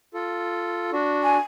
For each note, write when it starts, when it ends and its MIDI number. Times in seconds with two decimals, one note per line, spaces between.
0.14 0.90 65
0.14 0.90 69
0.93 1.37 62
0.93 1.37 66
1.24 1.38 80